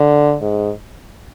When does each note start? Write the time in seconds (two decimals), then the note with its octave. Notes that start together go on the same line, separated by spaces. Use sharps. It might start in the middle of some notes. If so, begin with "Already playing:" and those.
Already playing: D3
0.41 G#2